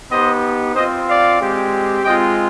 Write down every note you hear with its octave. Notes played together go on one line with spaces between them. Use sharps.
B3 D#4 G4 C5 D#5
C4 F4 C5 D#5
D5 F5
G#3 C4 G4
G#3 C4 F4 D#5 G5